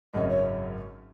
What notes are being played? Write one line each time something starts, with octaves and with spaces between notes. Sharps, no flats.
G#1 F#2 C#3 F#3 C#4 D#5
C#5